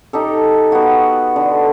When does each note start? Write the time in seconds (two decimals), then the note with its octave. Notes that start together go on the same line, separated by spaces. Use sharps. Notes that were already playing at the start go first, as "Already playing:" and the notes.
0.13 D#4 G4 A4
0.72 B3 F#4
1.36 D3